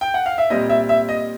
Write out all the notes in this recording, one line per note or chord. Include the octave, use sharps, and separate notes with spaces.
G5
F#5
F5
E5
A#2 G3 C4 D#5
E5
E5
D#5